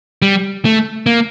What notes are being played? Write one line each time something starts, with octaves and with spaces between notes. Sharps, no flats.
G3
A3
A#3